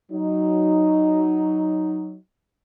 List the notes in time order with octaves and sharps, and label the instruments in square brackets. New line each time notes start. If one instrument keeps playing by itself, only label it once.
[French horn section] F#3 D#4